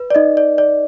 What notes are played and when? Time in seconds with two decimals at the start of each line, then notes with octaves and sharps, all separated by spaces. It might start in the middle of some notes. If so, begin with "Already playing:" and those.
Already playing: B4
0.10 D5
0.15 D#4 D#5
0.37 D5
0.58 D5